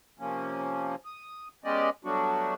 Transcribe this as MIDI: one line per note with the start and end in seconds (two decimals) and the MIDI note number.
0.19 0.95 48
0.19 0.95 53
0.19 0.95 58
0.19 0.95 61
1.05 1.48 87
1.64 1.90 56
1.64 1.90 59
1.64 1.90 61
1.64 1.90 67
1.64 1.90 74
1.64 1.90 75
2.04 2.54 54
2.04 2.54 55
2.04 2.54 57
2.04 2.54 59
2.04 2.54 62
2.04 2.54 66